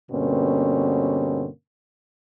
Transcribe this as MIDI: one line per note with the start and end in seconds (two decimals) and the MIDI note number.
0.11 1.48 43
0.11 1.48 47
0.11 1.48 50
0.11 1.48 58
0.11 1.48 60
0.11 1.48 61